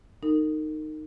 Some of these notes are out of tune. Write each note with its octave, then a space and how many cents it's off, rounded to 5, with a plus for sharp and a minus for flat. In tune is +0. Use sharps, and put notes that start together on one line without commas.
D#4 -10 A#4 -40